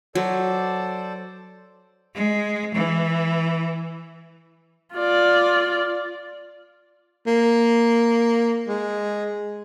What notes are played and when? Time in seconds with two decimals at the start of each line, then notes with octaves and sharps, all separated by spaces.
0.15 F#3 A4 C5 D5
2.15 G#3
2.74 E3
4.95 F4 D5
7.27 A#3
8.68 G#3